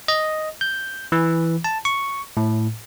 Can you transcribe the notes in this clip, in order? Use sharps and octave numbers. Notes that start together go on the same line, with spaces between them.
D#5
G6
E3
A5
C#6
A2